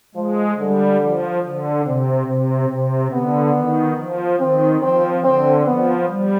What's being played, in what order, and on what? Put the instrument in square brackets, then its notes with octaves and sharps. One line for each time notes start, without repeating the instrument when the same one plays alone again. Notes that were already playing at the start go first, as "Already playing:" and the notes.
[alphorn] F3 [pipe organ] G#3
[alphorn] D3 [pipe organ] G3
[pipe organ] F3
D3
[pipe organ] C3 [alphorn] C4
[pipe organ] C3 [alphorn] C4
[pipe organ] C3 [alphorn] C4
[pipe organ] D3 [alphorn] B3
[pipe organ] D#3
F3
[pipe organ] D#3 [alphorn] C4
[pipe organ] F3 [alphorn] C4
[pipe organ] D3 [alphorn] C4
[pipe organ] F3 [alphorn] B3
[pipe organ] G3